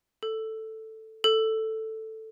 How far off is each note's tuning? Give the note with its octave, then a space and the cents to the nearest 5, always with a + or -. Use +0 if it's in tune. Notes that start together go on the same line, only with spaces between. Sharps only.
A4 +5
A4 +5